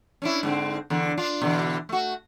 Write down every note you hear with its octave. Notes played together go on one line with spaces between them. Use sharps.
C#4 D4 E4
G#2 D3 C4
E2 D3
D4 F4
B2 D3 E3
A3 F#4